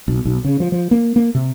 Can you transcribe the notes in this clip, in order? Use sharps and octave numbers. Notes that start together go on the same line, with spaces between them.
B1
B1
C#3
F3
F3
A#3
A#3
C3